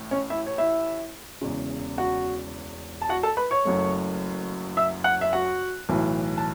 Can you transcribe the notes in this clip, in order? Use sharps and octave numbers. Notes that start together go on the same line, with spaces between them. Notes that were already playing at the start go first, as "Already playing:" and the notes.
Already playing: A1 A2
C#4 C#5
E4 E5
C#5
E4 E5
E1 E2 C#3
F#4 F#5
A5
F#4 F#5
A4 A5
B4 B5
C#5 C#6
F#1 F#2 F#3 A3
E5 E6
F#5 F#6
E5
F#4 F#5
B1 A2 E3
A5